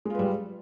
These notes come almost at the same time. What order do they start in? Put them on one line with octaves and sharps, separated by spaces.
G#3 F4 B4 G3